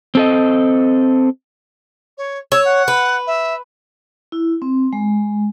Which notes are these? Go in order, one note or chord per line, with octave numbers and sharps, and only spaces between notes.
C4 A4 D#5
C#5
C#5 E6
F#5
B4
E5
E4
C4
G#3